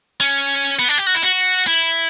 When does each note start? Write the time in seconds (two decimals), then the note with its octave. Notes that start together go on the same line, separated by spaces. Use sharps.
0.20 C#4
0.79 B3
0.89 D4
0.98 G4
1.07 F#4
1.15 E4
1.23 F#4
1.67 E4